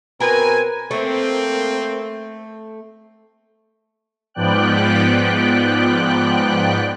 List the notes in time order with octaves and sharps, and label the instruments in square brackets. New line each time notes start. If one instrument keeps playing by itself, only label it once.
[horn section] B2 C4 G#5 [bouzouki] A#4 B4
[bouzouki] A3 [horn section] A#3 C4
[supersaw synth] G#2 F3 B3 D5 G5 F#6